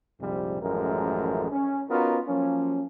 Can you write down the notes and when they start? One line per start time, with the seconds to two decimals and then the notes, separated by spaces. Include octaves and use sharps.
0.21 A#1 F2 G#2 C3 F3 G3
0.62 A1 F#2 F3 G#3 A3 A#4
1.52 C#4
1.90 B3 C#4 D#4 F4 F#4 A#4
2.28 F3 F#3 A#3 C#4